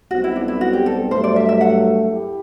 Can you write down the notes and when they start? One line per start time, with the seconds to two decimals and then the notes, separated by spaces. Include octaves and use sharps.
0.11 B1 B2 G3 C4 F#4
0.24 E4
0.36 D4
0.48 E4
0.61 F#4
0.73 G4
0.86 A4
1.11 G2 F#3 A3 C5
1.24 D5
1.36 E5
1.49 E5
1.61 F#5
2.12 E4 G4